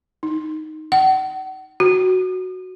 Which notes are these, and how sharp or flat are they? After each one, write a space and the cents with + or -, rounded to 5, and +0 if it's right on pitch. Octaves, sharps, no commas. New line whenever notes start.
D#4 +0
F#5 +40
F#4 +0